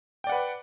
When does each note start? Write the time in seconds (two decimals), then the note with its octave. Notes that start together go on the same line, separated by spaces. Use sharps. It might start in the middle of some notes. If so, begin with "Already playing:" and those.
0.24 G5
0.27 D5
0.29 F#5
0.32 B4